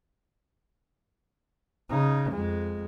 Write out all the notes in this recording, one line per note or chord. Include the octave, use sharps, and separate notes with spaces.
C#3 D#4
F2 G#3